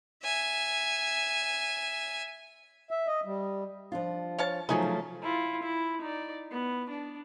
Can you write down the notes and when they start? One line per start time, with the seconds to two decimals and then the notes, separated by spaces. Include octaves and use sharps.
0.23 E5 G#5
2.91 E5
3.07 D#5
3.25 G3
3.92 F3 D4 F4
4.38 C#5 F5 A5
4.69 F3 F#3 A3 D#4 G#4
4.82 C#3
5.23 E4 F4
5.63 E4
6.01 D#4 D5
6.51 B3
6.90 D4